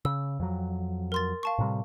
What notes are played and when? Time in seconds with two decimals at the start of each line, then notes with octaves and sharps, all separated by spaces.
0.05 C#3 E6
0.40 F2 F#3
1.12 A#4 C6 A6
1.43 F5 A5 C#6
1.59 A2 C3 G3